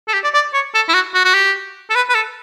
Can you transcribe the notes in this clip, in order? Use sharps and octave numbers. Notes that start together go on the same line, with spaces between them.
A4
G4
D5
D5
C#5
A4
E4
F#4
F#4
F#4
G4
A4
B4
B4
A4